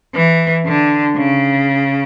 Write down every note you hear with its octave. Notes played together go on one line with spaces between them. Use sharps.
E3
D3
C#3